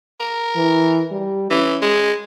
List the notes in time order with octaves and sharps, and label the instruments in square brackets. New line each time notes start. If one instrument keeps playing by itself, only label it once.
[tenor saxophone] A#4
[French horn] E3
G3
[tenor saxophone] E3 [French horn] C#4
[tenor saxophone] G#3